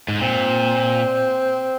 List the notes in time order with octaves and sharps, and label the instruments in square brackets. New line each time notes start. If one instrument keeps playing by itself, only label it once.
[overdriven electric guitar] G#2
[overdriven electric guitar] A#2 [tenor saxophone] C4